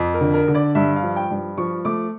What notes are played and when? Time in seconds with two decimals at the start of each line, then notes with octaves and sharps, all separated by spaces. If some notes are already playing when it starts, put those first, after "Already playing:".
Already playing: F2
0.14 A#4
0.21 D3
0.34 A#4
0.48 D3
0.55 D5
0.75 G2 E5
0.96 F5
1.02 F3
1.16 G5
1.31 G2
1.58 F3 C#6
1.85 A3 D6